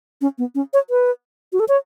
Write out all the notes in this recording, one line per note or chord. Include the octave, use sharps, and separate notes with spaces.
C#4
B3
C#4
C#5
B4
F#4
A4
C#5